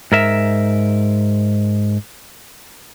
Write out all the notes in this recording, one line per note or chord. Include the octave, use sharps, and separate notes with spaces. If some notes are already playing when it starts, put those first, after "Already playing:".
G#2 A#4 E5